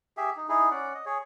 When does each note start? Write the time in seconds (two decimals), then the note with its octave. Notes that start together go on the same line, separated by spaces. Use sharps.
0.17 G4 G#4 E5
0.37 D#4
0.49 D#4 E4 G#4
0.71 C#4 D5 F#5
0.94 D#5
1.06 G#4 C#5